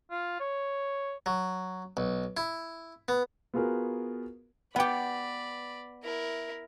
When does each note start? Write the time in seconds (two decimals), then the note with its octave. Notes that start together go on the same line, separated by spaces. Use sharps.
0.11 F4
0.40 C#5
1.26 F#3
1.97 B1
2.37 E4
3.08 B3
3.54 B3 F4 F#4 G#4 A#4 B4
4.76 B3 G4 D5 F#5 G5 B5
6.04 E4 A#4